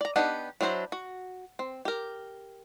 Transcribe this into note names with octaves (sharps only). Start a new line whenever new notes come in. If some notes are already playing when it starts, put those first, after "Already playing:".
D5 A#5
B3 D4 D#4 G4 F#5
F#3 D4 E4 C5 A#5
F#4
C4
G4 A#4